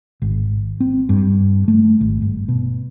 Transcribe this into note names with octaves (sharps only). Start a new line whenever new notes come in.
G#1
C4
G2
A3
G#1
G1
B2